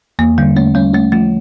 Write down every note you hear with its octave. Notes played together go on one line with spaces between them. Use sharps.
E2 A#3
D3 G3
A3 C#4
G3 C#4
A3 C#4
F3 A3